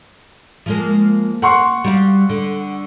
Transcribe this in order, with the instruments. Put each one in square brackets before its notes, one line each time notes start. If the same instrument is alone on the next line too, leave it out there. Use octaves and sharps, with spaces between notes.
[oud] F3 G#3 A#3
[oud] A#3 [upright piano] F#5 C6 C#6
[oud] G3 F#4 F5
D3